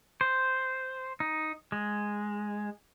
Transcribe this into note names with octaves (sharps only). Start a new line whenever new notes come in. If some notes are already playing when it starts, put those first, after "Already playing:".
C5
D#4
G#3